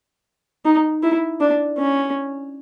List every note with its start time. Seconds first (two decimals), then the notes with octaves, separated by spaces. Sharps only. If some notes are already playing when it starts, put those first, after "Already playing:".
0.65 D#4
1.03 E4
1.40 D4
1.78 C#4